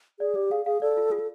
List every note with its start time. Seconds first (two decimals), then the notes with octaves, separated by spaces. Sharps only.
0.19 G#4 D5
0.35 G4 D5
0.51 G#4 F5
0.66 G#4 F5
0.81 A4 D5
0.97 F4
1.11 F4 G#4
1.20 A4